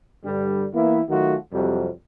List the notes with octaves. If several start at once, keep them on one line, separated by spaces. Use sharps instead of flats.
G2 D3 G3
E3 A#3 B3 E4
D#3 F#3 A3 F4 F#4
F2 C3 F#3 G3